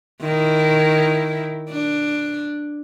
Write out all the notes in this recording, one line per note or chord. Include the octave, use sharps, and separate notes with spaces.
D#3 E4
D4